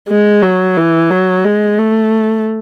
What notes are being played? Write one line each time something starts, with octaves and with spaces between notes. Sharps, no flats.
G#3
F#3
E3
F#3
G#3
A3